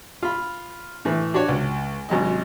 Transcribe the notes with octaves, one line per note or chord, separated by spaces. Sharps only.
F4 B5
A2 E3
D4 F#4 G4 C#5
C#2
G#1 F#2 C3 D#5